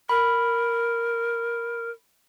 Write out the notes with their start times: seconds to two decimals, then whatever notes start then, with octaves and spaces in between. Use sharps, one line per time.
0.09 A#4 B5